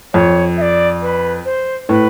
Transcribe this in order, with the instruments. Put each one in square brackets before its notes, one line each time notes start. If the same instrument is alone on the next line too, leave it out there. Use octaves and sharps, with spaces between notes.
[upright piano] F2 [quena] C#5
[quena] E5
D5
B4
C5
[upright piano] A2 [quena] B4